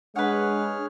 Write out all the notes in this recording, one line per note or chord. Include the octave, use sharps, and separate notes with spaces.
G#3 D4 G#4 B4 C#5 F#5 F6